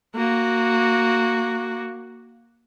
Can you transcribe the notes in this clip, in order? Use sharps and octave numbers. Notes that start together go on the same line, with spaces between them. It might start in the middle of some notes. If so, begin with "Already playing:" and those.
A#3 F#4